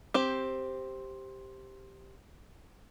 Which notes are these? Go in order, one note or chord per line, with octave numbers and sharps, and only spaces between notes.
C4 G4